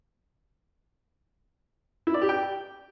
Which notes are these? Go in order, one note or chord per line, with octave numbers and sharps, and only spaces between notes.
E4
D5
G4
G5